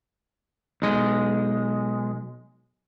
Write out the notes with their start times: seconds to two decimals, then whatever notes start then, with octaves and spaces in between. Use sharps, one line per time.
0.82 B1 G#3